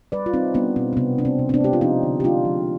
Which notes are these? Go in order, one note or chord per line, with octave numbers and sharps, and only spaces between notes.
G3 B4 D5
F4
G3 C4 D#4
G3 B3 D4
B2 C4
C4
C3 B3
C3 D4
C4
C3
C4
B3 D4
G#3 G4
F4
F3 C4 D#4
D3
G4
G#3 D4 F4
F3